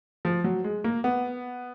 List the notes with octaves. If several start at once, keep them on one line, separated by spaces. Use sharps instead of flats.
F3
F#3
G#3
A#3
B3